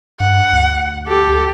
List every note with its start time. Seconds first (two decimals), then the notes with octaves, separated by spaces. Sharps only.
0.20 G2 F#5
0.53 D2
1.08 G4 A4